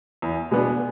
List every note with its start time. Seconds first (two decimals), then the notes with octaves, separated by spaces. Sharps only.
0.22 E2
0.51 B2 G#3 B3 D4